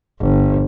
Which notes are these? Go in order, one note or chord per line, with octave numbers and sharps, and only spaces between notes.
G1